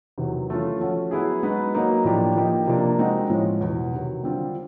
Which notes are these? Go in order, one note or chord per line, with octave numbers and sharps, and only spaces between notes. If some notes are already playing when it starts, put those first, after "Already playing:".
E2 C3 D#3 F#3
E3 A3 C#4 F4
F3 A3 C#4 F#4
F#3 B3 E4 G#4
G#3 B3 D#4 F#4 B4
F#3 A#3 D#4
A2 F3 A#3 D4 G4
F3 A#3 D#4 G4
C3 F3 A#3 D4
G#3 C4 D#4 F#4
A2 F3 G#3 C#4
E2 B2 F#3
C3 D#3 F#3
D3 G3 C4 F4